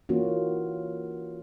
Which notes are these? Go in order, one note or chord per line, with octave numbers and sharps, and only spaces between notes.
E3 A#3 C#4 D4 F4 F#4